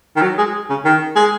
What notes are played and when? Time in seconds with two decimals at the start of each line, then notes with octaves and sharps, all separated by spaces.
0.16 D#3
0.22 F#3
0.38 G#3
0.70 C#3
0.85 D#3
1.16 G#3